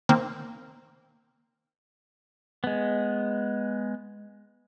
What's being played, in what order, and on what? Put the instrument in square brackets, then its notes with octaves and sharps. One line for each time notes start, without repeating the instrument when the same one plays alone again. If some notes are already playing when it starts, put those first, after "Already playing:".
[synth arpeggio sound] D#3 A#3 C4
[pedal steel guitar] G#3 B3